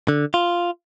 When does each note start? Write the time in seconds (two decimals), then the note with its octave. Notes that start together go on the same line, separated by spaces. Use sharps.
0.08 D3
0.34 F4